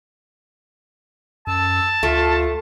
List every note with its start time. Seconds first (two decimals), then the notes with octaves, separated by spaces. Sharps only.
1.47 F#2 A5 E6
2.03 D2 A3 F4